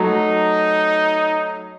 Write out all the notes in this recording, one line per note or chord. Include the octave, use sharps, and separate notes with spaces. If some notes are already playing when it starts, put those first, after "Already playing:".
Already playing: F#3 A3 D#4